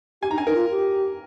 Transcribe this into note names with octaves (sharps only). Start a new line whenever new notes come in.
G4 G#5
D#4 A#5
D4 G#5
D#4 A#4
F4
G4